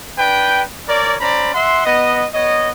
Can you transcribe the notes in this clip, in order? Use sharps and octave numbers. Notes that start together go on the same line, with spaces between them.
D4 B4 G5
A#4 C#5 D5
C#4 C5 D5 A#5 B5
E5 F#5 C6
B3 D#5
B3 C#5 D#5